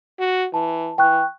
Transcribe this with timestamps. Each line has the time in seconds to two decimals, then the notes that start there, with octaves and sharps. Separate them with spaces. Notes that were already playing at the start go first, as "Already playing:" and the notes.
0.20 F#4
0.54 E3 A5
0.98 E3 G5 C#6 F#6